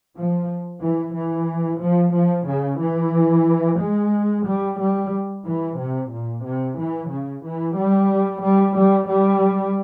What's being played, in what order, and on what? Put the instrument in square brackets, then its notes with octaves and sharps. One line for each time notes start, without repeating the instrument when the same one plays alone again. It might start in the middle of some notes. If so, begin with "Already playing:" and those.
[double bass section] F3
E3
E3
F3
F3
C#3
E3
G#3
G3
G3
E3
C3
A#2
C3
E3
C#3
E3
G3
G3
G3
G3